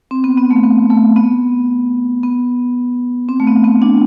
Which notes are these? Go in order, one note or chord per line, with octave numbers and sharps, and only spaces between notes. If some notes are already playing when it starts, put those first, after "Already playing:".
C4
B3
B3
A3
B3
A3
B3
B3
C4
A3
B3
B3
D4